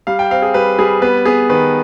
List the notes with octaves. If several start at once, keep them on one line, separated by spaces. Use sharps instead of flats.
G3 F5
G5
C4 F5
G#4
G3 B4
G3 G#4
B3 B4
B3 G#4
D#3 B4